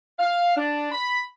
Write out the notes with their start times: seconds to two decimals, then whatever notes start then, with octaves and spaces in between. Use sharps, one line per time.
0.19 F5
0.56 D4
0.92 B5